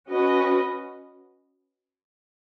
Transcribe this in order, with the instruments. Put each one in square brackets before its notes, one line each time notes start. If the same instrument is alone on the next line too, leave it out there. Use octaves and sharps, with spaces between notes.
[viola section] C#4 F#4 B4 D#5